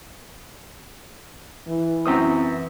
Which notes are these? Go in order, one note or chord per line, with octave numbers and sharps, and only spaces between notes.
E3
F#2 C4 D#6